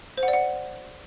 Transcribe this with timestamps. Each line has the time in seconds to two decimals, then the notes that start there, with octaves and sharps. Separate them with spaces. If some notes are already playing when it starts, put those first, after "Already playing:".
0.18 C5
0.23 F#5
0.28 D5
0.33 F#5